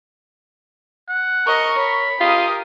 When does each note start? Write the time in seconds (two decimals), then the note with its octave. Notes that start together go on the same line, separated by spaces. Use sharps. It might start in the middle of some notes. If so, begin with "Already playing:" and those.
1.09 F#5
1.47 A#4 D#5 C#6
1.78 C#5 B5
2.21 F4 G4 A#4 D#6